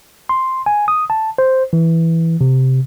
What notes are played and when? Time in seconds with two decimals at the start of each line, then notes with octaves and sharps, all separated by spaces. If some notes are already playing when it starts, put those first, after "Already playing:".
0.29 C6
0.66 G#5
0.88 D#6
1.10 A5
1.38 C5
1.73 E3
2.41 C3